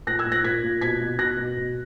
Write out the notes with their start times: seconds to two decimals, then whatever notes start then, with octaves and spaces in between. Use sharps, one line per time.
0.07 A#2 F#6 A#6
0.19 E6 G#6
0.26 A#2
0.32 F#6 A#6
0.44 A#2 G#6 B6
0.63 A#2
0.81 B2 G#6 B6
1.00 B2
1.18 B2 F#6 A#6
1.37 B2
1.57 B2